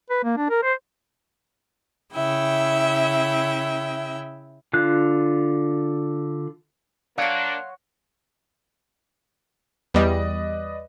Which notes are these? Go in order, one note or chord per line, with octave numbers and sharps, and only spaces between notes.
B4
A#3
D4
A#4
C5
C#3 E4 E5 G5
D3 F4 F#6
A#3 D4 C#5 F5 F#5 C6
E2 G3 B4 D5 D#5